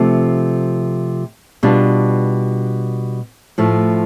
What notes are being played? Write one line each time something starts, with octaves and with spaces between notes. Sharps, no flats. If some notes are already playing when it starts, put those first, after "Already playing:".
Already playing: C3 F3 A3
B2 G3 D4 F4
A2 F3 A3